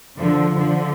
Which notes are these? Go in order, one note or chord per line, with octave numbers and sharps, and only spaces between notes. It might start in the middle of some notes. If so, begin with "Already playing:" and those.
D3 F3
D3 F3